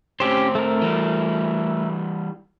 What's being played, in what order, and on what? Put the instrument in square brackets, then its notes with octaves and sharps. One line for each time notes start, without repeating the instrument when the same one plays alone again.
[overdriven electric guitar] A2 C4 [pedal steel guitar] C#4 G4 C5
[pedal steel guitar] A3 A#4
[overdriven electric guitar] E3 G3